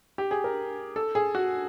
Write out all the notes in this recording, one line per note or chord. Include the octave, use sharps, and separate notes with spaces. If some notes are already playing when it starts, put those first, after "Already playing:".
G4
G#4
A#4
A4
G#4
F#4